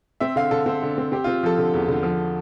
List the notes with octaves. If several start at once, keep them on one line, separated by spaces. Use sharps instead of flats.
C4 E5
D3 F5
D3 A4
C4
D3
C4
C4 G4
C4 F4
F3 A4
D3
E2
D3
F3